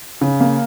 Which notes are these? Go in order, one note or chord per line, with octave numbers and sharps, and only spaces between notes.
C#3
A#3